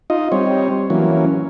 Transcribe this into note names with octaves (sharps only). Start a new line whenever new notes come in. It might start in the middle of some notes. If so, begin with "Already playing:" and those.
D#4 F4 D#5
G3 C4 C#5
E3 F#3 A#3 C#4